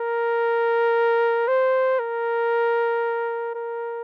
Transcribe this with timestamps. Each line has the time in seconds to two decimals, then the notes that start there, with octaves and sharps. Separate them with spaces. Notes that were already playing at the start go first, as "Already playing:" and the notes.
Already playing: A#4
1.48 C5
1.99 A#4
3.55 A#4